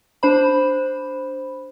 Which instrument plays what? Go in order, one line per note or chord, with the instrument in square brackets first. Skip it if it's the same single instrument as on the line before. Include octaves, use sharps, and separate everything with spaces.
[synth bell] D4 C5 B5